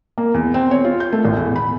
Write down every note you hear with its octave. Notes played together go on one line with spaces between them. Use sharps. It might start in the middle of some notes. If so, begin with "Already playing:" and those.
A#3
E2
C4
C#5
F4
G6
A3
A1
E2
B5